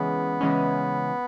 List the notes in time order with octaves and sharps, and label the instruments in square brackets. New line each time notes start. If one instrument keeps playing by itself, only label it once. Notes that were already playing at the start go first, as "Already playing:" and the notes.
Already playing: [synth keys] C#3 E3 G#3 C#4 [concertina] B3
[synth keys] C#3 E3 G#3 C#4